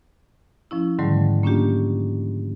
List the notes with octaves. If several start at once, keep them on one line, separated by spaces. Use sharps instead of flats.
F3 C#4 E4
G#2 D3 D#3 F#3 G3 A3
A#3 C#4 D4 F4 G4